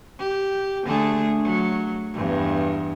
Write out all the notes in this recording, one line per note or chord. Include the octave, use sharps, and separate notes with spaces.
G4
D3 A3 G#4
F#3
E2 G2